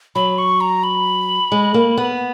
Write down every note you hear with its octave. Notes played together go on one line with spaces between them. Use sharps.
F#3 B5
C#6
A#5
B5
G#3
A#3
B3